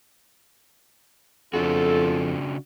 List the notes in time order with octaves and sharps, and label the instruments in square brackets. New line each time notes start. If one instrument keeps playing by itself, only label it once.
[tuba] F2 [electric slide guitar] C#3 D4 F#4 [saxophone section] F4 G#4 A4